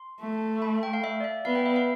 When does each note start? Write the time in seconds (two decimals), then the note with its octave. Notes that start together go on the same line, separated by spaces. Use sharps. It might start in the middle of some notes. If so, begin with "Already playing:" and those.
Already playing: C6
0.21 A3
0.62 B5
0.83 G5
0.93 F5
1.04 E5
1.20 D5
1.24 E5
1.45 B3 F5
1.55 G5
1.66 E5
1.76 F5